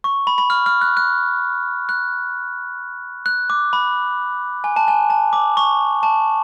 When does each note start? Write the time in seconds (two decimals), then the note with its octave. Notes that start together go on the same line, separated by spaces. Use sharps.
0.04 C#6
0.27 B5
0.38 B5
0.50 F6
0.66 F6
0.81 F#6
0.97 F#6
1.89 F#6
3.26 F#6
3.50 D6
3.73 B5
4.64 G#5
4.76 A5
4.88 G#5
5.10 A5
5.33 D6
5.57 C#6
6.03 A5